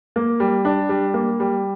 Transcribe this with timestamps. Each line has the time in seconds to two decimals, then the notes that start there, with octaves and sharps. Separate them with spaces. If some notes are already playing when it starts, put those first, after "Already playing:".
0.16 A#3
0.40 G3
0.65 D4
0.89 G3
1.14 A#3
1.40 G3